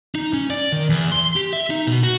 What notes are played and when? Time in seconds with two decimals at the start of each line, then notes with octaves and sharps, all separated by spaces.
0.15 D#4
0.33 C#4
0.50 D5
0.72 D#3
0.90 E2
1.12 C6
1.36 G4
1.53 E5
1.70 D#4
1.87 B2
2.03 F#4